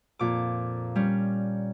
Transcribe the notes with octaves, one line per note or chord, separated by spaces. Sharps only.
F2 A#2 D6
G3 C#4